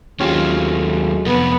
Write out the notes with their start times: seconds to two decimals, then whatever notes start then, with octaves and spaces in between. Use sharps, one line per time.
0.20 D#2 F#3 G#3 A3 C4 C#4 F4 G4
1.27 F2 C3 B3